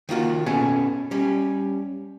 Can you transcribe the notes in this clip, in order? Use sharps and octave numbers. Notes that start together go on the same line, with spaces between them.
D#3 A#3 F4 F#4
B2 B3 C#4 G#4 A4
G3 C#4